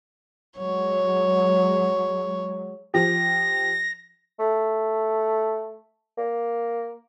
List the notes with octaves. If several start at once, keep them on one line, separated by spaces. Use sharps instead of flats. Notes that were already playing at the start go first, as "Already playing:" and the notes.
F#3 G#3 C#5
F3 G4 A#6
A3
A#3